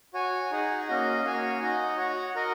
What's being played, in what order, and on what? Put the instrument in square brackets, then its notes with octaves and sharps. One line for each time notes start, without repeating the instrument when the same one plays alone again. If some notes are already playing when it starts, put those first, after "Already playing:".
[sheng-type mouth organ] F#4 C#5 G#5
D#4 G#4 F#5
A#3 C#4 F#4 D#5
A#3 F#4 C#5 G#5
D#4 F#4 D#5 F#5
F#4 C#5 F#5
F#4 A#4 D#5 F#5